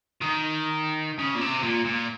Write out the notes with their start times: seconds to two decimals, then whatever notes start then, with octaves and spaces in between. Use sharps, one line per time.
0.21 D#3
1.19 C#3
1.35 A#2
1.41 C3
1.63 A#2
1.85 A#2